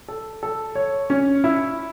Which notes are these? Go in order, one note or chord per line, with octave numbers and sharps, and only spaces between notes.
A4
A4
C#5
C#4
E4